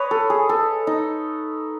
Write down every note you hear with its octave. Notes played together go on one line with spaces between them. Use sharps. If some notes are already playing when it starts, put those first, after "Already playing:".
Already playing: B4 C#5 D#5
A4
G#4
A4
D#4